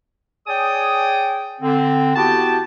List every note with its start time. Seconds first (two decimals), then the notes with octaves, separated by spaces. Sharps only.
0.47 G#4 C#5 D5 G5 G#5 D#6
1.61 D3 C4
2.16 B3 E4 F#4 G4 G5 A5